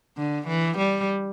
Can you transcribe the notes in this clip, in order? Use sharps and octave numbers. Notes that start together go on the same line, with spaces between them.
D3
E3
G3